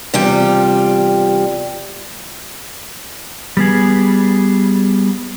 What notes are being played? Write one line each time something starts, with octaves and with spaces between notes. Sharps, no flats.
E2 C3 G3 F4 G5
G3 B3 G#4